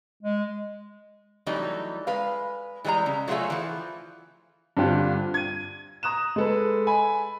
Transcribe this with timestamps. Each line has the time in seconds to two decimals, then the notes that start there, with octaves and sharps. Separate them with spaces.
0.23 G#3
1.46 E3 F#3 G3 A3 D#4
2.07 G#3 B4 F5
2.84 E3 G3 G#3 C#5 A#5
3.06 C#3
3.28 F#3 A3 F4 F#4 G#4 E5
3.50 E3 F3
4.77 G2 D3 C4 D4 F4 G4
5.34 G#6 D#7
6.03 A#5 D#6 F#6 E7
6.36 G#3 A4 B4
6.87 G#5 B5